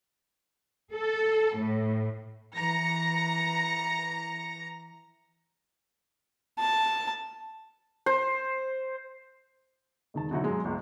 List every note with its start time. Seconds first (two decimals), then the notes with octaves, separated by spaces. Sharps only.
0.93 A4
1.58 A2
2.56 E3 A#5 A#6 C#7
6.59 A5
8.06 C5
10.14 E1 D#3 A5
10.31 B2 D3 F#3 D#4 E4 F#4
10.44 F#2 G#3
10.65 G1 C#2